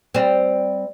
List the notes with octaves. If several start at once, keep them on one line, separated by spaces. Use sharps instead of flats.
G3 C4